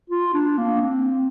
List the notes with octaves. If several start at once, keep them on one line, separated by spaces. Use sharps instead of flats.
F4
D4
A#3
C4